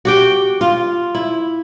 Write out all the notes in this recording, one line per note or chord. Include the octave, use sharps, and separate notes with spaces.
F#4 G4 G5
F4
E4